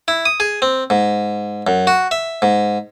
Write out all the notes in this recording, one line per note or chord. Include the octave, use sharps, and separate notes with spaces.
E4
D#6
G#4
C4
G#2
F#2
F#4
E5
G#2